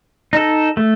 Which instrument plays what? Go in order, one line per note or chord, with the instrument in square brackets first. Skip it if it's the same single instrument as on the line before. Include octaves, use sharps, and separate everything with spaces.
[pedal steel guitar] D#4 A4
A3